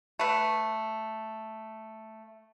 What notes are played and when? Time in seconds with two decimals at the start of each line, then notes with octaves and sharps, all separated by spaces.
0.19 A3 B4